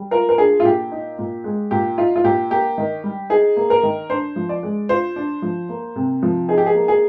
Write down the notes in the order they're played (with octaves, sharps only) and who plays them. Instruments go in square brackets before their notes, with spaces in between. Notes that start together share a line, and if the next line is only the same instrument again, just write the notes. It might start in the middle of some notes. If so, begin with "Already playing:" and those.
Already playing: [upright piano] G3
F4 A#4
A#4
D4 G#4
F4
A#2 G4
D#4
A#2
G#3
A#2 G4
D#4 F4
F4
A#2 G4
A#3 G4
D#3
G3
D#4 G#4
A#3
A#4
D#3
D4 C5
F3
D5
G#3
F4 C5
D4
F3
A#3
C3
F3
D#4 G#4
G4
G#4
A#3
G#4